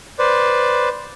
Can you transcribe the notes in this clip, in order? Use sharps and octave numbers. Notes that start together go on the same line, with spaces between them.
B4 C5 D5